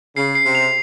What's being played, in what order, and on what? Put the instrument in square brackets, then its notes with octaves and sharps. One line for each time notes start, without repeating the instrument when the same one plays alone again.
[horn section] C#3 [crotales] C7
[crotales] C7
[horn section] C3
[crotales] F7